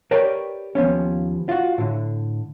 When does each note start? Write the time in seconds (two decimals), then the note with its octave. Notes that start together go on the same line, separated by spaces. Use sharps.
0.11 G4 A#4 B4 C#5 D5 G5
0.75 D#2 F3 B3 C#4
1.49 F4 F#4
1.78 A2 D3